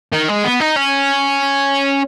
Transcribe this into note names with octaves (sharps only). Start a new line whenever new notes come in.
D#3
G#3
B3
D#4
C#4